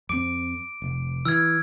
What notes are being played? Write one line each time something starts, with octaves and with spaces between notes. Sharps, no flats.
F2 C4 D6 D7
F1
E3 E6 F6 G#6